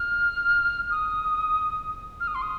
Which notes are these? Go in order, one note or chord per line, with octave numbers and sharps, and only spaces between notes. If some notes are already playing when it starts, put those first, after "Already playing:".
Already playing: F6
D#6
F6
D#6
C6
D#6